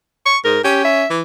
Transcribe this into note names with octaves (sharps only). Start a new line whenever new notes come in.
C#6
G#2 A#4
C#4 G4
E5
E3